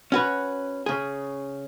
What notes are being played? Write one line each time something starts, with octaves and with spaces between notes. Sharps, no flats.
C#4 F#4 B4
C#3 G#4